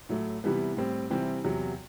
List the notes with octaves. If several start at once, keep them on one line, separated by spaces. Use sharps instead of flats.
A2 F#3 A3
C3 E3 G3 B3
A2 G3 C4
C3 E3 G3 C4
E2 C3 F#3